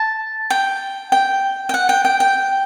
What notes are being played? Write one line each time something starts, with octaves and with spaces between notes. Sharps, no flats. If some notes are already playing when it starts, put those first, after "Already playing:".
Already playing: A5
G5
G5
G5
F#5
G5
G5
G5